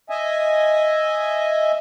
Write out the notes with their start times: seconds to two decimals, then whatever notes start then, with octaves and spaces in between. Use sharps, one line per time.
0.10 D#5 E5 G#5